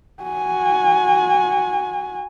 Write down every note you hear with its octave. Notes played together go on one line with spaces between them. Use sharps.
F#4 G#5